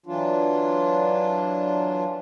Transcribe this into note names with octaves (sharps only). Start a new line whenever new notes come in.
E3 F#3 D4 F4